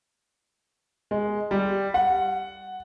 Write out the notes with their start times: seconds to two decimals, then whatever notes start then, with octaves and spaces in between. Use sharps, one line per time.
1.11 G#3
1.51 G3
1.94 F#5